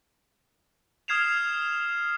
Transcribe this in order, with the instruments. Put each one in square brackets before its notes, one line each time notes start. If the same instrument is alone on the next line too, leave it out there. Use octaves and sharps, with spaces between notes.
[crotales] D#6 F6 G#6 C7 E7 F7